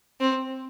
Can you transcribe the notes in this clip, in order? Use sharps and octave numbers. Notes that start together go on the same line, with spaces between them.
C4